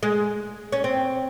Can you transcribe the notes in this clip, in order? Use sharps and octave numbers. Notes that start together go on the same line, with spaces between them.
G#3
C#4
C4